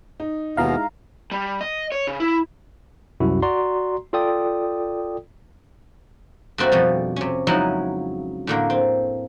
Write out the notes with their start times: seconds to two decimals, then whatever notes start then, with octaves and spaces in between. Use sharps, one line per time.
0.20 D#4
0.57 D#2 B2 G#3 B3 D#4 E4 F5 A#5
1.31 G3
1.61 D#5
1.92 C#5
2.07 C#3
2.20 E4
3.20 C2 F#2 E4 F#4
3.42 F#4 D5 A#5 C6
4.13 F4 A4 D5 G5 D#6
6.58 G2 D3 A3 A#3 C4 F#4
6.72 F2 B2 G3
7.16 C3 C#4
7.47 F2 C#3 F#3 G#3 D#4 E4
8.47 A2 D3 A#3
8.70 C4